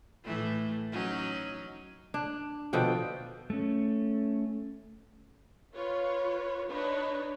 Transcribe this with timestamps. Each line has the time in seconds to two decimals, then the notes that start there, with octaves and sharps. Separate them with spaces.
0.24 A2 E3 A3
0.91 F#3 C#4 D#4
2.14 D4
2.73 B2 D3 F3 G5
3.50 A3 C#4
5.73 F4 B4 C#5
6.69 D4 D#4 B4 C#5